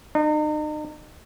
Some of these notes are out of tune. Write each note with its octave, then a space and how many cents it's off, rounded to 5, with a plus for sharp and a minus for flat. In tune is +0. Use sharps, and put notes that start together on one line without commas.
D#4 -40